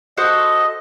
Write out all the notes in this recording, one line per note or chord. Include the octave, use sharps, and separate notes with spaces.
F#4 A4 C5 D#5